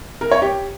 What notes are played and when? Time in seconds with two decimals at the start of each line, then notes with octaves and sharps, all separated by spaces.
0.21 A#4
0.31 C#5
0.42 G4